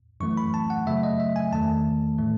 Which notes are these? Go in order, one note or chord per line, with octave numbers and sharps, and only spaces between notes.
F#2 E3 A3 C#6
B5
A5
F#5
F#2 C#3 F#3 A3 E5
D#5
E5
G#5
E2 D#3 A3 A5
A2 E3 A3